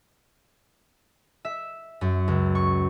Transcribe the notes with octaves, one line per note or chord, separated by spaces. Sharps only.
E5
F#2
C#2
C#6